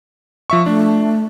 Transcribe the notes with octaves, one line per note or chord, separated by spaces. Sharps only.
F3 E5 C#6
A3 D4